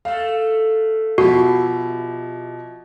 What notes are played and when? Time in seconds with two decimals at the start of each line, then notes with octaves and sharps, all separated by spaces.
0.05 A3 A4 F5
1.18 B2 F3 E4 F#4 G4